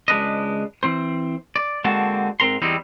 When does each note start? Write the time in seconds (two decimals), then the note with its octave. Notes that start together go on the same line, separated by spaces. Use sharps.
0.08 C#2 G#3 D4 B4 D#5
0.83 E3 C4 C5
1.56 D5
1.84 D3 G#3 A#3 C4 F#4 A5
2.40 G#2 C4 A#4 A#5 C6
2.62 E2 G3 C4 D#4 E4